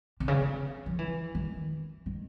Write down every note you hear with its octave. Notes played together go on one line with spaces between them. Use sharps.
C3
C#3
D3
F3
E3
D#3
D#3